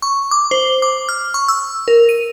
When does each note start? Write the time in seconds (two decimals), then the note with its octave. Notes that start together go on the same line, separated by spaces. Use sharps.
0.02 C#6
0.31 D6
0.51 C5
0.82 D6
1.09 F6
1.34 C#6
1.48 E6
1.88 A#4
2.09 D#7